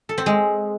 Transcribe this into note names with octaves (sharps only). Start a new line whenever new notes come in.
A4
C4
G#3